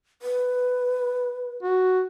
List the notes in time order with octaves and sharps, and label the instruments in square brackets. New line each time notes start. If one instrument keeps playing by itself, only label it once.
[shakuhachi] B4
[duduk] F#4